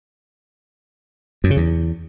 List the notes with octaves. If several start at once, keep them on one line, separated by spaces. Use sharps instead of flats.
F#2
C#3
E2